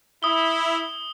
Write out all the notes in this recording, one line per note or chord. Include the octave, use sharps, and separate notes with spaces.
E4 D#6 G7